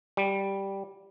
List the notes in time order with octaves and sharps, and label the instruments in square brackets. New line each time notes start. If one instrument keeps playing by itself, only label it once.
[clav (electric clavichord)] G3